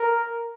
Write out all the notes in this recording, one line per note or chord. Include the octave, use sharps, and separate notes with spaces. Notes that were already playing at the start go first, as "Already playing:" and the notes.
Already playing: A#4